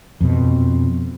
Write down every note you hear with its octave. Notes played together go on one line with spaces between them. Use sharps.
F2 B2